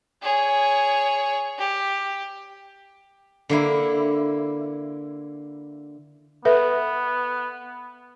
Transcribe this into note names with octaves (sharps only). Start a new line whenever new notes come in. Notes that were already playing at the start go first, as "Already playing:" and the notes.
G#4 C#5
G4
D3 A#3 E4
B3 A4 B4 E5